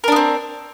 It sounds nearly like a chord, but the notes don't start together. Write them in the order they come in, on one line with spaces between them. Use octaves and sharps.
A#4 D4 B3 C4